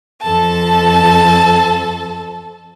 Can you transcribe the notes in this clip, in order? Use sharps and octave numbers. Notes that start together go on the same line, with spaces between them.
F2 A4 A5